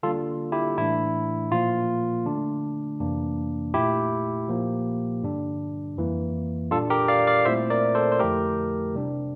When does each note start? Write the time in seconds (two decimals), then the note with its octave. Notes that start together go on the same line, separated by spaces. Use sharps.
0.03 D3 G3 A#3 D4 F4 A4
0.52 E4 G4
0.78 A2 E3 A3 D4 E4
1.52 A#2 F3 A#3 F4
2.26 D3 A3 D4
3.00 F2 C3 E3 A#3 D4
3.74 A#2 A3 E4 G4
4.49 A#2 F3 A#3
5.23 G2 D3 G3 D4
5.97 F2 E3 A#3 E4
6.71 A#2 G3 D4 F4 A4
6.90 G4 A#4
7.08 D5 F5
7.27 D5 F5
7.45 A#2 A3 C4 E4 C5 E5
7.70 A#4 D5
7.95 A4 C5
8.12 C5
8.19 F2 D3 F3 A3 E4 G4 A#4
8.95 C3 G3 D4